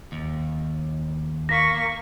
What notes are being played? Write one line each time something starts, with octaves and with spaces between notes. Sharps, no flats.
D#2
A#3 C#6 A#6 B6